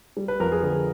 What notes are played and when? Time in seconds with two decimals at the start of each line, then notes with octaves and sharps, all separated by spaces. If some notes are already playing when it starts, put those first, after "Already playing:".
0.17 G3
0.28 B4
0.40 F2 A#4
0.52 G#4
0.63 D3 G#4